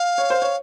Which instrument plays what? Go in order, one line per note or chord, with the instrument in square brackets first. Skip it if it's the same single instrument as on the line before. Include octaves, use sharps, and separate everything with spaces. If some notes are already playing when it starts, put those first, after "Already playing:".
Already playing: [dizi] F5
[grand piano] C#5
C5
C#5